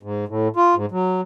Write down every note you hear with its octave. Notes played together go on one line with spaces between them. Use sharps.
G#2
A2
F4
G#2
F#3